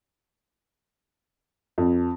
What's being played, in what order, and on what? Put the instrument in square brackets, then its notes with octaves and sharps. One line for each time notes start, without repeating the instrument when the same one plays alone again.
[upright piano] F2